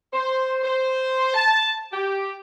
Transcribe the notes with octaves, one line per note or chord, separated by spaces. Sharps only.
C5
C5
A5
G4